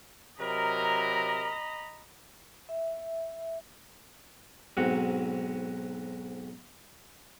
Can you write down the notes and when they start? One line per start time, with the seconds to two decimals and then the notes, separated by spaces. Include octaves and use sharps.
0.40 C3 F#3 A#4 D#5 A#5 B5
2.69 E5
4.77 B1 G#2 C4 F#4 F#5